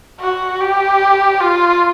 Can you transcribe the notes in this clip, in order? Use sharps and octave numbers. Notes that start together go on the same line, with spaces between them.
F#4
G4
F4